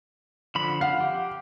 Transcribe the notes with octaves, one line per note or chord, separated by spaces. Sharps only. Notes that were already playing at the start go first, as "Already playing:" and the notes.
D3 F3 B5
F5 F#5
G4